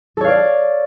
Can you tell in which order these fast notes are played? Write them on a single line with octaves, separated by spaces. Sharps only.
A4 C#5 F5 D5